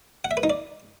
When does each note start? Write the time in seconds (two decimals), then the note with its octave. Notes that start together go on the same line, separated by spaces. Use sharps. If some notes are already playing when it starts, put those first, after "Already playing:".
0.25 F#5
0.31 E5
0.37 B4
0.43 D#4
0.50 D5